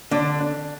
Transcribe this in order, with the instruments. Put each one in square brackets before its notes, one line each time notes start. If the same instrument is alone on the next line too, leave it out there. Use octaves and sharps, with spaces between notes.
[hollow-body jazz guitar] D3 [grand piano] D4
[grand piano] D4